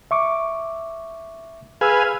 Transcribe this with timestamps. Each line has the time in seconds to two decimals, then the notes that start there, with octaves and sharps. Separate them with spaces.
0.11 E5 C#6 D6
1.81 G#4 B4 F5 G#5 E6